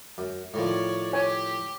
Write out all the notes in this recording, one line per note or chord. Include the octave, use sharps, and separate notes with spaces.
F#2
A2 D#3 F3 C#5 D5
G4 C#5 G#5